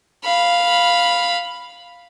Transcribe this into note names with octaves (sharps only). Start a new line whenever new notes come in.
F5 B5